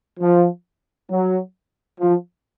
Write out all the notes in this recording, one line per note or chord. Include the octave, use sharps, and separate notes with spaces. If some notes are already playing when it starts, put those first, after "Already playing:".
F3
F#3
F3